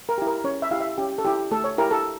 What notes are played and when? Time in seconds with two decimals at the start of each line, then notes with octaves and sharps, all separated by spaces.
0.09 A#4
0.18 E4 G4
0.27 A#4
0.44 C#4 C#5
0.62 E5
0.71 E4 G4 F5
0.80 E5
0.98 C#4 G4
1.18 A4
1.25 E4 G4
1.51 A3 A4
1.64 C#5
1.78 E4 G4 A#4
1.91 A4